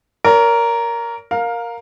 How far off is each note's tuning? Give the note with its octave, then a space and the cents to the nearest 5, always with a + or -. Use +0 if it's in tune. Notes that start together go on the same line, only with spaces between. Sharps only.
A#4 +0 C#5 +45
A#4 +0 F5 +15